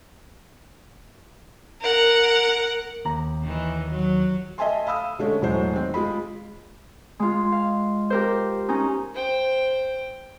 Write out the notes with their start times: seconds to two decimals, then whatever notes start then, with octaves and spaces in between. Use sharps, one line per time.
1.82 A#4 F#5
3.05 D#2 A#5
3.43 D#3 E3
3.90 F#3
4.58 D#5 E5 G#5 A5 C6
4.87 F5 B5 D#6 E6
5.19 D3 G#3 A3 C#4
5.42 E1 A2 F#3 G#3 C5
5.75 D#3 C4
5.94 G#3 F4 G#4 B5
7.19 G#3 F4
7.52 F5
8.10 G4 A#4 C5
8.68 C#4 D#4
9.14 C5 G5